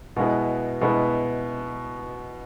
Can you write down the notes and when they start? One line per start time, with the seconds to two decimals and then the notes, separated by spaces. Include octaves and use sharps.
0.16 B2 G#3 B3 E4
0.81 B2 G#3 B3 E4